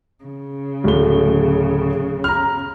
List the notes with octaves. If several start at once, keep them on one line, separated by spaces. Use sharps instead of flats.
C#3
D1 A3 G7
A#5 F6